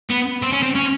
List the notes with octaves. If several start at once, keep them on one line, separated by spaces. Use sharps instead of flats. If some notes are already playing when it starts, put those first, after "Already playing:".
B3
C4
C#4
C4
C#4